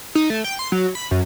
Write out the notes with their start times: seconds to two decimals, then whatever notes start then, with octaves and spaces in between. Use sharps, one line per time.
0.15 D#4
0.30 A3
0.44 G5
0.59 C6
0.72 F#3
0.95 B5
1.11 F#2